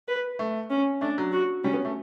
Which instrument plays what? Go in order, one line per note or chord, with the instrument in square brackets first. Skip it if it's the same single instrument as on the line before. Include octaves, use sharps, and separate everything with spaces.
[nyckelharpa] B4
[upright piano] A3
[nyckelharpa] C#4
[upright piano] A3 [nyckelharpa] D4
[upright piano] F#3
[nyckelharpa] F#4
[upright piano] G3 [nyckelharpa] C#4
[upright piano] B3
A3